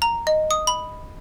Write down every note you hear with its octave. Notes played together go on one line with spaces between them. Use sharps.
A#5
D#5
D#6
B5